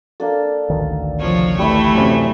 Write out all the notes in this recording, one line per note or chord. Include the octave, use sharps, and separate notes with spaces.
A#3 D4 A4
A1 D2 D#3
C3 F3 C#5
E3 G3 A3 E4
F#2 C3 C#4